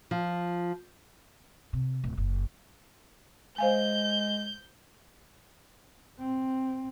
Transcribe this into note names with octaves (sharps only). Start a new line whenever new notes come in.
F3
C3
D1
F#1
G#3 C5 F5 G#5 G6
C4